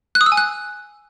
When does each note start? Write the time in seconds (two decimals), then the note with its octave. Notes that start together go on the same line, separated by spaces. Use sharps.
0.15 F#6
0.21 D#6
0.26 E6
0.32 G#5
0.37 F#6